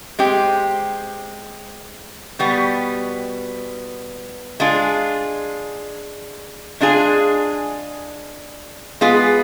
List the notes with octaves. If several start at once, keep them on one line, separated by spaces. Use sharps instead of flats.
G#3 C4 G4
B2 G3 B3
G#3 D4 F4 G#4
G#3 D4 F4 G#4
G#3 B3 F4 G#4